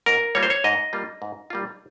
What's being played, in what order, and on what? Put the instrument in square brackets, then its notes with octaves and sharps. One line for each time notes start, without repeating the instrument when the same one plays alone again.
[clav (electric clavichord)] G#2 A#4
G3 A#3 F4 C#5
C5
C#5
G#2 D#5
G3 A#3 F4
G#2
G3 A#3 F4